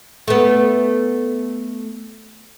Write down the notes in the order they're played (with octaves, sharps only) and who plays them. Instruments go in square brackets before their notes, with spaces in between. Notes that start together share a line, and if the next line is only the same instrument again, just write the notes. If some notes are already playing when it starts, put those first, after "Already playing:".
[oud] A3 B3